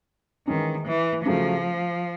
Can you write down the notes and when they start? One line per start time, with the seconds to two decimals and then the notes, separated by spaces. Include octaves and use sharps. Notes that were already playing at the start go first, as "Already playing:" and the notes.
0.47 D#3 E3 G#3 C#4
0.86 E3
1.25 C#3 F3 F#3 A3